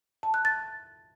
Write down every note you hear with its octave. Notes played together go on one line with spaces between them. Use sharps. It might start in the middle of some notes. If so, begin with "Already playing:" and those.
A5
F#6
A6